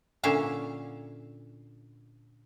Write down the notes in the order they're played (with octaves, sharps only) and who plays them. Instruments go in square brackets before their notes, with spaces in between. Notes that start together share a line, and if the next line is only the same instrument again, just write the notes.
[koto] A#2 D3 C#4 E5 F5